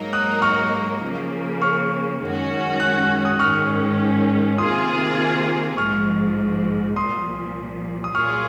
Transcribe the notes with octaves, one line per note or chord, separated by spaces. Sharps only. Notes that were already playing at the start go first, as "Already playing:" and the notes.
Already playing: G#2 F#3 A#3 D#4 A#4
D#6 F#6
C#6 F6
C#3 F3 A#3
C#6 F6
F#2 D#3 G#3 C#4 F#4
F#6
F#6
D#6 F#6
G#2 D#3 G#3 C#4 C#6 F6
C3 D#3 A#3 F4 G#4 C6 D#6
A#1 G#2 F3 C#6 F6
C2 A#2 F3 C6 D#6
D#6
A#2 F#3 A#3 F4 G#4 C#6 F6